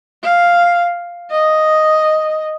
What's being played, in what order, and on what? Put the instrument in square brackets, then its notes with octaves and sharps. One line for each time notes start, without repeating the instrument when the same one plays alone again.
[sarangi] F5
D#5